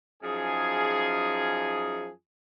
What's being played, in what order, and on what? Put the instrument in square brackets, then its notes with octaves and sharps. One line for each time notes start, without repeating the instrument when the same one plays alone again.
[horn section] F#2 F3 D#4 G#4